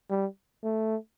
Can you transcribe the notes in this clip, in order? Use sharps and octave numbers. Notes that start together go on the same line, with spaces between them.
G3
A3